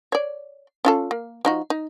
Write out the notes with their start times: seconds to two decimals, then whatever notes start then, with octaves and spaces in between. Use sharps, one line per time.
0.12 C#5 D5
0.85 C#4 F4 A4
1.11 A#3
1.45 F3 D#4 F#4
1.70 D#4